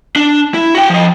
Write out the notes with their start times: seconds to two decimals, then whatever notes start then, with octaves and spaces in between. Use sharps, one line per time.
0.16 D4
0.54 E4
0.75 F#4 G5
0.90 F3 D#5